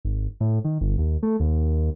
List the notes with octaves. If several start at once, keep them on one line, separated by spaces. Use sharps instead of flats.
G#1
A2
D#3
G1
D#2
A3
D#2